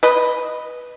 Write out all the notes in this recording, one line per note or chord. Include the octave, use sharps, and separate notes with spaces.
B4 D#5